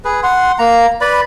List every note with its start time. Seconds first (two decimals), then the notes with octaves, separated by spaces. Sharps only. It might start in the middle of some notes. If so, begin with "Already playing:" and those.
0.05 G#4 B4
0.23 F#5 C6
0.59 A#3 A#5
1.01 B4 D5 B5